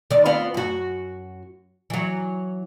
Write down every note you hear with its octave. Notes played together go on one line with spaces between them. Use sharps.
D#3 D5
B3 C4 F4
F#2 F#4
E3 F#3